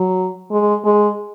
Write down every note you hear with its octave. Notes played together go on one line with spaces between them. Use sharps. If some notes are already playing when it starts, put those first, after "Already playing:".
Already playing: F#3
G#3
G#3